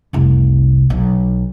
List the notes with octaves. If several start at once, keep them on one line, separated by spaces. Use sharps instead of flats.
F1 C2
B1